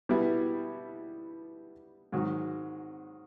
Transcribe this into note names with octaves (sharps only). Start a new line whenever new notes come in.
B2 G3 B3 E4
G#2 D#3 F#3